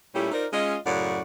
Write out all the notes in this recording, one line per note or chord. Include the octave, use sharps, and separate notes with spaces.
A#2 G3 A3 C#4 E4 G4
D#4 F4 A#4 C5 D5
G#3 C#4 F4 D#5
F#2 A2 C#3 C#5 D5 F#5